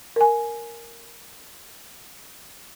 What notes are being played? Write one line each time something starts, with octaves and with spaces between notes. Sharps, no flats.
A#4 G#5